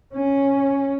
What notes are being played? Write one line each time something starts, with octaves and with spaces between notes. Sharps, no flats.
C#4